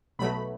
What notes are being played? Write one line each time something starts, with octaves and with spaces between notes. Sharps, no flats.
B1 B2 F#3 A3 B5